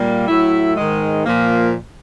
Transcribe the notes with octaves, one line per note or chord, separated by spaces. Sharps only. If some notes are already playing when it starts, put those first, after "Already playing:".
Already playing: A#2 G3 A#3
A2 F#3 A3 E4
G#2 D#3 G#3
A#2 F3 A#3